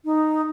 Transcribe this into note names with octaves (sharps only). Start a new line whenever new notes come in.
D#4